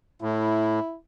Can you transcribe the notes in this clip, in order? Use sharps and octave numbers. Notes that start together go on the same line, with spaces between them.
A2 E4